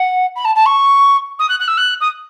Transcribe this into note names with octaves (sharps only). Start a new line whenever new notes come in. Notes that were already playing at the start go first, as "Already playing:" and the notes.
Already playing: F#5
B5
A5
A5
C#6
D#6
F#6
F#6
E6
F#6
D#6